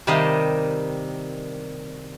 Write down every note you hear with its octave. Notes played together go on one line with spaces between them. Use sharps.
C3 D#3 G3 A#3 D#5 C6